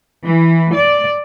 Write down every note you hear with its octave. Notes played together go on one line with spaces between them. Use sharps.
E3
D5